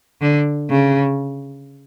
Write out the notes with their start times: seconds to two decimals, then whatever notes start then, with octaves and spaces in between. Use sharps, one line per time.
0.22 D3
0.70 C#3